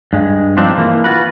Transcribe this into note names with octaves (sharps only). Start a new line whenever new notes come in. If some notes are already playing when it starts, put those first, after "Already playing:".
G2 G#3
F3 C4 D4 D#4 F4
E3 A#3
F4 F#4 B4